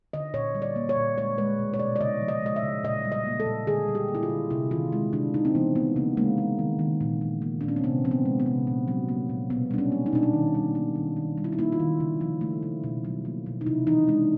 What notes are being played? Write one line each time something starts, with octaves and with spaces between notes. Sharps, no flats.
D3 D#5
A#2 C#5
G3
D5
A#3
C#5
A#2
G#3 C#5
G#3 B4
B2
C#5
B2 D5
D5
C#3 D#5
F3
D#5
G#3 D#5
E5
C#3
A#2 D#5
G3
D#5
A#3
A4
A#2
D3 G#4
G3
G4
A#3
E4
F4
D3
C3 E4
D#3 F4
G#3 E4
C3 D4
C#3 D#4
C4
E3 B3
A3 B3
C#3 A#3
G#3 A#3
G#3
D#3
D#3
A#2
F3
A#3
A#2 D4
C#4
C4
C3 B3
F3 C4
B3
G#3
B3
C3
A#2
F#3
A#3
A#2
B2 B3
G3 D4
C#4
A#3
D#4
B2 D4
D#4
D#3
G3
A#3
D#3
D#3
G3
E4
D#4
A#3 E4
F4
D#3
C#3
F3
A3
C#3
B2
F#3
A#3
B2
D#4
C3 E4
E3 D#4
G#3 D4